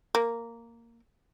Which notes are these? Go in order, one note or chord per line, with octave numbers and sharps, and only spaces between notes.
A#3